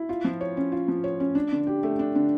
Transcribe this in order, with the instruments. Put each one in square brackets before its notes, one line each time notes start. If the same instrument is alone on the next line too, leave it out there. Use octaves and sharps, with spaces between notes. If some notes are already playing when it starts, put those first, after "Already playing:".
Already playing: [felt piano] E4
F4
F3
C#5
C#4
F4
F3
C#5
C#4
D4
D3
G4
A3
D4
D3